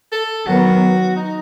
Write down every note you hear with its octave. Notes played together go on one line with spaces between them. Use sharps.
A4
D#3 F#3 B3 F#4
D#4